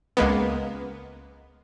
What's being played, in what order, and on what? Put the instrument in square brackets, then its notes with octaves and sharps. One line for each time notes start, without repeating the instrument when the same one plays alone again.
[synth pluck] C#2 G#3 A#3 B3